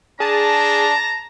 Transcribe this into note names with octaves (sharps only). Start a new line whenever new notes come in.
D4 G#4 A5 A#5